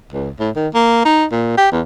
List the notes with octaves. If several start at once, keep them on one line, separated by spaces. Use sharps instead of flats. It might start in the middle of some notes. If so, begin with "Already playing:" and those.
C#2
A2
D#3
A#3
D#4
A#2
G4
E2